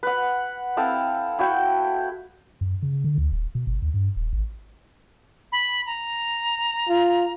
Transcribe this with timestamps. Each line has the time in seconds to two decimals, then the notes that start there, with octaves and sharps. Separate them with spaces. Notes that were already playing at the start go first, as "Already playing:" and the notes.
0.03 B4 F#5
0.77 C4 E4 A4 F5
1.39 E4 F#4 F#5 G5
2.61 F#2
2.82 C#3
3.04 D3
3.18 D2
3.31 D#1
3.55 B2
3.67 G1
3.82 D#2
3.94 G2
4.16 D#1
4.33 G#1
5.52 B5
5.86 A#5
6.89 F4